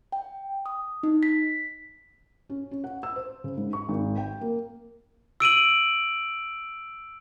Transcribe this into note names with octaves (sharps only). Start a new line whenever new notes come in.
G5
D#6
D#4
B6
C#4
C#4
F#5
E6
C5
C#3
G#2
C#6
G#1
G5
A#3
E6 D7 D#7 F#7